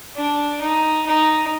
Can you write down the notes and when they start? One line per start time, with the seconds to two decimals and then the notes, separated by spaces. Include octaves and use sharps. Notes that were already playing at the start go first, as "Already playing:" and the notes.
0.16 D4
0.61 D#4
1.06 D#4